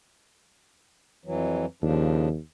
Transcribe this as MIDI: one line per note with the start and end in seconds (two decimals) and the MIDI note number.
1.25 1.66 41
1.25 1.66 52
1.25 1.66 54
1.83 2.37 39
1.83 2.29 49
1.83 2.29 53
1.83 2.29 62